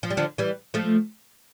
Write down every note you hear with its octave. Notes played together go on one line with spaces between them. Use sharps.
F3
G3
D3 F3
E3 G3
F3 A3